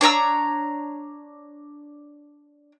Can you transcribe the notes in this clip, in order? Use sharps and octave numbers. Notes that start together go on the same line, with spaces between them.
D4 C#5 A#5 E6